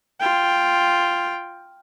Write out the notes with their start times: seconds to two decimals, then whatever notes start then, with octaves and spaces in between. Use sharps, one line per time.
0.20 F4 G5